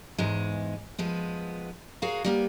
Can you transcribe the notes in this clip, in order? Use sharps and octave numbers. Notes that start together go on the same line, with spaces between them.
E2 G#2 G#3
F3 G#3 B3
F#4 G#4 A#4 C#5 F5
G3 A#3 B3